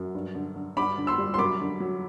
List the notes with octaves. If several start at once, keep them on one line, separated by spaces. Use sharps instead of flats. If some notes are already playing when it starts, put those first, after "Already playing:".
Already playing: F#2
G2
D3
D3
G2 B5 D6
D3
C6 E6
G3
C6
F#2 B5 D6
D3
F#3